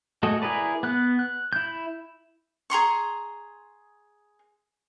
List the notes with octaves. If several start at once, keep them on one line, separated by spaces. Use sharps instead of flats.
G#3 A3 F#4 A4 D#5
E4 G#4 A#4 B4 D5
B3 F#6
F#6
E4 G6
G#4 A#5 C6 C#6